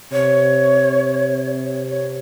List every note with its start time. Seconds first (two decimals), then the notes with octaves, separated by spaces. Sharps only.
0.12 C3 C#5
1.65 C#5
1.90 C#5